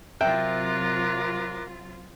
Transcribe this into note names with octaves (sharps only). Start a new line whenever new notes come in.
C3 F#3 F4 A#4 E5 G5 D6 F#6